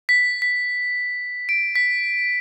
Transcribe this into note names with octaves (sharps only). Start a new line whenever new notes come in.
B6
B6
D7
B6